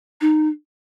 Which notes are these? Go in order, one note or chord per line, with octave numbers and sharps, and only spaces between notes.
D#4